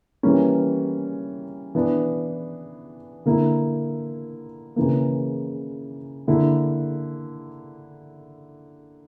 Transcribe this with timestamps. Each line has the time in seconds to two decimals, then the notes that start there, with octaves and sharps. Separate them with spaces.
0.23 E3 G3 A#3 C#4
1.75 E3 B3 D4
3.26 D3 A#3 E4
4.76 C#3 E3 A#3
6.28 D3 A#3 E4